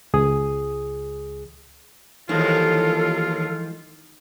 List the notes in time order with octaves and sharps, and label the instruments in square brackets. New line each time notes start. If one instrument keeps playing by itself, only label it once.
[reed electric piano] C#2 G#4 D#6
[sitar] D#2 [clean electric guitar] E3 F3 G#3 [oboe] F4 [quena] A4